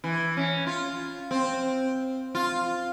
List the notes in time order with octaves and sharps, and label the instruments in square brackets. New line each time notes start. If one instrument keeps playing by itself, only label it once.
[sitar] E3
C#4
F4
C4
F4